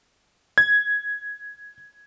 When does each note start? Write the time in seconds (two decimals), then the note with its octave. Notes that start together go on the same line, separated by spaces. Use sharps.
0.58 G#6